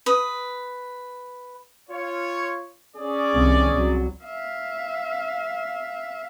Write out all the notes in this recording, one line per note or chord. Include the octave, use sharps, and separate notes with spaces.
B4 D#6
F4 C#5
C#4 G#4 D5
C2 D#3
C2 F#3
E5 F5